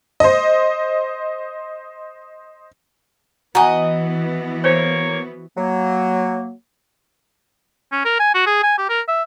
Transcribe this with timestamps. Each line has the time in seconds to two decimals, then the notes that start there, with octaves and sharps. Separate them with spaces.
0.20 C5 D#5
3.55 E3 B3 F#4 D#5 F#5 G#5 A#5
4.64 A#3 C5 C#5
5.57 F#3 A#3
7.92 C#4
8.05 A#4
8.20 G#5
8.35 F#4
8.46 G#4
8.63 G#5
8.78 G4
8.89 A#4
9.08 E5